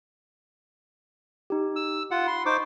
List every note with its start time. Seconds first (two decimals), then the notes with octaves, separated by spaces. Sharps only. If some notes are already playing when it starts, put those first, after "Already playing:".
1.50 D#4 G4
1.76 E6
2.11 F4 F#5
2.27 B5 C6
2.46 D#4 C5 C#6 D6